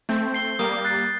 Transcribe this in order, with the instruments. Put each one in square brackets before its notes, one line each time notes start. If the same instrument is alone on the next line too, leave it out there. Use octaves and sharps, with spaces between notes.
[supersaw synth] A3 C4 [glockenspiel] G6
[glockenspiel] C7 G7
[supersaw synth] G3 A#3 [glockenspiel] D#6
[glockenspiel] F#6 A6 C7